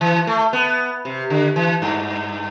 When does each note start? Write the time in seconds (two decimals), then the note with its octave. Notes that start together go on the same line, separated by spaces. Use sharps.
0.01 E3
0.27 A3
0.53 B3
1.05 C3
1.30 D3
1.56 E3
1.82 G2